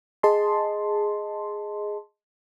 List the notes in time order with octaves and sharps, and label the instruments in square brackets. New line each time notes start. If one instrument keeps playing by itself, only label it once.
[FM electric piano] G#4 D#5 A5 C6